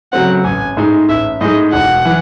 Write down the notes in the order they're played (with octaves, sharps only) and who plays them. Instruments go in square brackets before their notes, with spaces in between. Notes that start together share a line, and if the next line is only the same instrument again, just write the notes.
[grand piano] C#3 F#3 A3 C4 [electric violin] F#5
[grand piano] A1 [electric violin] G#5
[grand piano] A2 G#3 D#4 G#4
[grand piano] A1 [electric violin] E5
[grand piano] A2 G#3 D#4 G#4 [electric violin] D#5
[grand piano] E1 [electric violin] F#5
[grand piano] E3